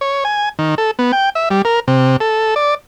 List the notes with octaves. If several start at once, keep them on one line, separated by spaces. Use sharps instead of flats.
C#5
G#5
D#3
A4
B3
G5
E5
G3
A#4
C3
A4
D5